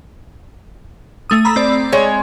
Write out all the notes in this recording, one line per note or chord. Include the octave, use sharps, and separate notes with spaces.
A3 D#6
A#5 B5 E6
C4 D5
G#3 C#5